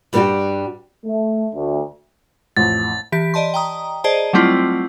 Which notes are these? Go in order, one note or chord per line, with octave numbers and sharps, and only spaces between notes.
G2 G3 B3 D4 F#4 G4
A3
D2
A1 F2 A6
E3 G4 B6
D5 D#5 A5 C6
G5 A#5 D#6
G#4 C5 D5 D#5 A5
F#3 G3 A3 C4 E4 F4